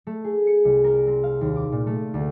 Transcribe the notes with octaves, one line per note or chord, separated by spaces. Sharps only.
A3
G#4
C#7
C2
A#4
C4
F5
D#2
D6
A#2
A3
D2